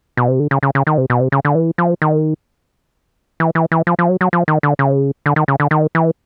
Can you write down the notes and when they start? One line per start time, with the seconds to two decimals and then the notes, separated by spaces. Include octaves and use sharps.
0.17 B2
0.28 C3
0.40 D3
0.51 C#3
0.63 C#3
0.75 C#3
0.87 D#3
0.98 C3
1.10 B2
1.20 C3
1.32 C#3
1.45 D3
1.55 E3
1.78 F3
2.02 D#3
3.40 E3
3.55 E3
3.72 E3
3.87 F3
3.99 F3
4.09 F#3
4.21 F#3
4.33 F3
4.48 D#3
4.63 D3
4.79 C#3
5.26 D3
5.36 D#3
5.48 C#3
5.60 D3
5.71 D#3
5.95 E3